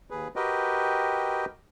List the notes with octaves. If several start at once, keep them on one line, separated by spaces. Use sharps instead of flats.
D#2 G#4 B4
F#4 G4 A#4 B4 D#5 G5